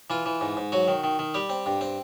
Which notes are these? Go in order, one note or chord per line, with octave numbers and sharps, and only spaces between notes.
E3 F4
E3
G#2
G#2
F#3 F#4
D#3
D#3
D#3
G3 G4
C4
G2
C4